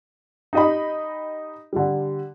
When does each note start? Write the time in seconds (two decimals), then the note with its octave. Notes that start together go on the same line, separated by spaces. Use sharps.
0.53 D#4 G4 D#5 G5 B5
1.73 D3 G3